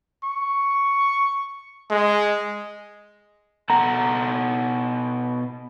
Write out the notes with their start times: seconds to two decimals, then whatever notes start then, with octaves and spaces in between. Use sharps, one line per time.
0.24 C#6
1.90 G#3
3.70 B2 A4 F#5 A#5